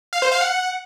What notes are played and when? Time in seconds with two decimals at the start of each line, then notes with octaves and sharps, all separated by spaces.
0.13 F5
0.22 C5
0.32 F5
0.41 F#5